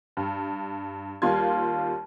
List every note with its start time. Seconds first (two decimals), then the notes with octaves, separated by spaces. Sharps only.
0.17 G2
1.22 D#2 G3 F4 C6 G#6